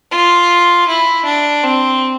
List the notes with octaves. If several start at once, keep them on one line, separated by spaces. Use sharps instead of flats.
F4
E4
D4
C4